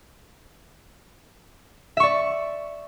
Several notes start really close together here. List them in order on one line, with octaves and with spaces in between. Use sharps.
E5 C#6 D5